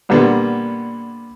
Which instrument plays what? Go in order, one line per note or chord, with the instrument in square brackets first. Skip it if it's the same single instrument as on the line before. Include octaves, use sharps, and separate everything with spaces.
[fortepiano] A#2 D3 G3 A#3 B3